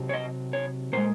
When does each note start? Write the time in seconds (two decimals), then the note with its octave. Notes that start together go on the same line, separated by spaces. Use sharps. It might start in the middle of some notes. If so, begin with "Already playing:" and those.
Already playing: C3 F#3
0.09 C#5
0.14 D#5
0.53 C#5
0.93 A#2 G#3 C5